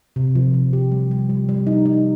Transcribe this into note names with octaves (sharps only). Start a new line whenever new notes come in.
C3
F3
C3
G4
G3
G3
G3
G3
D#4
D#4